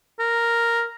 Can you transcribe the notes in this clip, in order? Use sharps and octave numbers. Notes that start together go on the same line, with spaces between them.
A#4